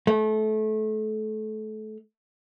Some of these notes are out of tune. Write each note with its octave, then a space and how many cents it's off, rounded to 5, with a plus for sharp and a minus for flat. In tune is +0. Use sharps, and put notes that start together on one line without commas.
A3 -25